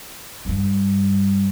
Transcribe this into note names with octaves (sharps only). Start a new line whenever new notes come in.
G2 G3